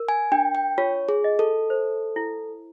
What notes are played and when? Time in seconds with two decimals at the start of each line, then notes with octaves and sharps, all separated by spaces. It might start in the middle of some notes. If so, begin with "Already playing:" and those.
Already playing: A#4
0.08 G#5
0.32 D4 G5
0.55 G5
0.78 F4 C#5
1.09 G#4
1.24 D#5
1.39 A4
1.70 C5
2.16 E4